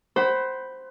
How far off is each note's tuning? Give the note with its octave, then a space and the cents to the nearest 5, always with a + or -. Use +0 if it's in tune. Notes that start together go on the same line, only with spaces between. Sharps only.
C5 +0 F#5 +35 B5 +0